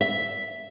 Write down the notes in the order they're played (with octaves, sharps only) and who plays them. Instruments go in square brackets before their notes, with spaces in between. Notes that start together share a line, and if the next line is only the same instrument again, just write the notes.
[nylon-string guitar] E5